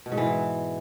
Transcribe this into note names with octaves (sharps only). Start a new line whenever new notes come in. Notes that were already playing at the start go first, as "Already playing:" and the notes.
B2
G#2
E3